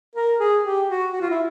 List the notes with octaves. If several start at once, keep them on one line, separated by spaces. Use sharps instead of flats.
A#4
G#4
G4
F#4
F#4
F4
E4